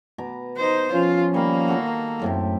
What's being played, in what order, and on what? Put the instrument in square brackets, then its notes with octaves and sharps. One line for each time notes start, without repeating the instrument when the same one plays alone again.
[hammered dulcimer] B2 A#5 D6
[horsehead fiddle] D#4 C5
[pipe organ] F3 C#4 [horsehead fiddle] F4
[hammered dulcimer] D#3 G3 [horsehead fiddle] A#3
[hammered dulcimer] F#4 A4 A#4
[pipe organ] F#2 [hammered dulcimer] A2 C3 G4